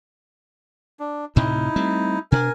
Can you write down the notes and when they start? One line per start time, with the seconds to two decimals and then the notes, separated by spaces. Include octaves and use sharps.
0.99 D4
1.36 D2 A2 C3 D#4 E4
1.76 G3 A3 C4
2.32 B2 C4 D4 A#4 G#5